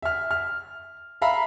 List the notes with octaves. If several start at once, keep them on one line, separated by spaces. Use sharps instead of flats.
E5 F6
F6
E5 F5 A#5 B5